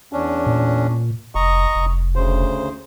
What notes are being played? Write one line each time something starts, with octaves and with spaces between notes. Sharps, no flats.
E2 C#4 D4
A#2
F1 D#5 A#5 C#6
F1
D2 C#3 C5